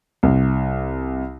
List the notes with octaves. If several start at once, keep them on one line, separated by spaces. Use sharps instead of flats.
C2